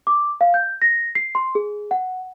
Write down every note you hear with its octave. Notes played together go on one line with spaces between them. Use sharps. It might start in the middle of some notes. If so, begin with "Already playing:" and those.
D6
F5
G6
A#6
C7
C6
G#4
F#5